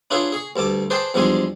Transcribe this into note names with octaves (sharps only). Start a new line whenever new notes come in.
D4 E4 F4 G#4 B4 C#5
G#4 C#6
D2 G2 A5 D6
G#4 B4 C5 D5 G5 A5
E2 F3 G3 G#3 D4 G#5